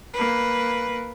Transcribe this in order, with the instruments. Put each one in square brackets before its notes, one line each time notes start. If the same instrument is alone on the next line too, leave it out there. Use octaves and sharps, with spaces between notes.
[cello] A#3 B4